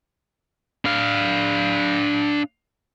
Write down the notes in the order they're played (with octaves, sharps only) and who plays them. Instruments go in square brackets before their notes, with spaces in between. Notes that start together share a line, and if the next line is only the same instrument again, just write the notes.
[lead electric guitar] D4 F5